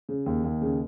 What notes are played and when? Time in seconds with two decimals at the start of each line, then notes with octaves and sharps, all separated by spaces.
0.09 C#3
0.26 D#2
0.44 D#2
0.62 C#3